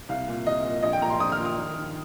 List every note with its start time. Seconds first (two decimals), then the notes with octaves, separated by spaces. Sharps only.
0.09 C2 F5
0.28 A#2
0.47 C2 D#5
0.65 A#2
0.82 A#1 D#5
0.93 G5
1.01 A#2 A#5
1.10 C6
1.20 A#1 D#6
1.32 F6
1.38 A#2
1.45 D#6
1.57 D#2
1.75 D#3